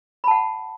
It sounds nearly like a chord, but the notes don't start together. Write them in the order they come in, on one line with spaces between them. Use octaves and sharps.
B5 A5 F#5